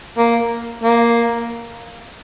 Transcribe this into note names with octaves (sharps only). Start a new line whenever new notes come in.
A#3
A#3